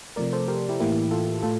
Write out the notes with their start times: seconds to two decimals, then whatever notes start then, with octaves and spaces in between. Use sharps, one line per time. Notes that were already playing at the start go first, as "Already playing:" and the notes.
0.16 C3 F3 A3 A#4 D5
0.33 A4 C5
0.48 G4 A#4
0.69 E4 G4
0.80 A2 E3 A#3 E4 G4
1.11 F4 A4
1.43 A2 F4 A4